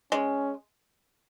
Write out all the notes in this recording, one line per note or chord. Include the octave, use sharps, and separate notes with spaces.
G#3 C#4